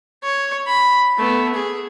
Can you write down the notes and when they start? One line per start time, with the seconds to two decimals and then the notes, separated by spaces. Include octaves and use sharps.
0.23 C#5
0.67 B5
1.17 A3 B3
1.54 G#4